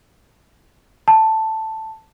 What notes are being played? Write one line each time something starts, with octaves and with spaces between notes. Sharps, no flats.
A5